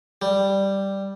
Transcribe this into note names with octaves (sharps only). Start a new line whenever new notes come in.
G3